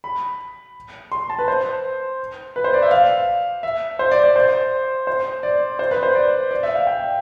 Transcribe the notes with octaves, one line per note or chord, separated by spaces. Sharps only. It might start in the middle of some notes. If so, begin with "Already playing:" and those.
B5
C6
A5
B4
C5
B4
C5
D5
E5
F5
E5
C5
D5
D5
C5
C5
D5
C5
B4
C5
D5
D5
E5
F5
G5